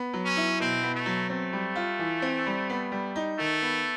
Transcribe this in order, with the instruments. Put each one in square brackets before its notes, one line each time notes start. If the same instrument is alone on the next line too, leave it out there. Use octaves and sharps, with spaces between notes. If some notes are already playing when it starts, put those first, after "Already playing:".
Already playing: [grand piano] B3
F#3
[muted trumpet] C#4
[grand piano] E4
[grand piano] B2 [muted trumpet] C4
[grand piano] B3
[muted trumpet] A3
[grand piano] F#3
[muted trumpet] A3 [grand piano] C4
[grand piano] G3
F4
E3
C4
G3
B3
G3
D#4
[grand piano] D#3 [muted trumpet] A3
[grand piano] B3